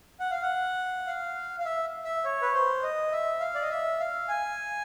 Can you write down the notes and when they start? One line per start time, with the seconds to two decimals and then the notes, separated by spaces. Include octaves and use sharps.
0.20 F#5
0.31 F5
0.42 F#5
1.07 F5
1.60 F5
1.65 E5
2.05 E5
2.25 C#5
2.42 B4
2.54 C5
2.83 D#5
3.12 E5
3.40 F5
3.55 D5
3.62 D#5
3.70 E5
3.99 F5
4.28 G#5